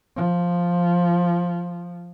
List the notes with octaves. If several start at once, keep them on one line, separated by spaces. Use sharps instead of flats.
F3